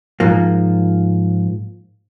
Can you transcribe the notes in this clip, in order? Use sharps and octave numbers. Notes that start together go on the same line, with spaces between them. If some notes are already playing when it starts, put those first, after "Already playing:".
G#2 F3 A#3